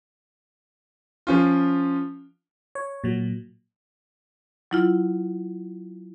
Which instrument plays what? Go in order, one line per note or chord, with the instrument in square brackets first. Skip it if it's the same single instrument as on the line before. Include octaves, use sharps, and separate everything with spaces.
[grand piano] F3 C#4 F4
[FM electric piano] C#5
A#2 F#3
[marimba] F#3 E4 F4